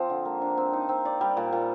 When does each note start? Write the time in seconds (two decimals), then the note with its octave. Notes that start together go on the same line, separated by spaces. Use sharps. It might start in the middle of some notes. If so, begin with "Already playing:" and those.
Already playing: F3 C4
0.10 D3
0.25 A#3
0.42 D4
0.58 C4
0.73 D#4
0.89 C4
1.05 D5
1.21 G3
1.37 A#2
1.53 A#2